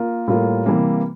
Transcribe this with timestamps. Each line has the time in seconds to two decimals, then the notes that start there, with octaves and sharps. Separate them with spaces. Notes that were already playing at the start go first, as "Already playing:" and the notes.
Already playing: A#3 F4 A#4
0.28 A2 G3 A#3 F4 A#4
0.66 C3 E3 G3 A#3